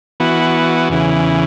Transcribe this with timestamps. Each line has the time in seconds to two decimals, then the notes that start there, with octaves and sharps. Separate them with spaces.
0.20 E3 B3 F#4
0.89 E2 C#3 E3